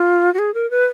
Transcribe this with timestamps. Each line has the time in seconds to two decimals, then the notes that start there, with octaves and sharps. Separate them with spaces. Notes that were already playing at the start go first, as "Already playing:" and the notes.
Already playing: F4
0.34 F#4
0.39 G#4
0.54 A#4
0.71 B4